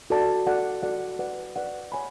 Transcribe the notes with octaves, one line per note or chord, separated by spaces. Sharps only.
F#4 A4 D5 A5
F#4 A4 D5 F#5
F#4 A4 D5 F#5
B4 D5 F#5
B4 D5 F#5
C#5 G#5 B5